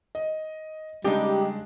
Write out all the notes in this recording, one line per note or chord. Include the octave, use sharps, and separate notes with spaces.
D#5
C#3 G3 G#3 D4 D#4 G4